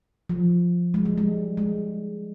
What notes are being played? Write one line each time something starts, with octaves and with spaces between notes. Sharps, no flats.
F3
G#3
G3
G#3
G#3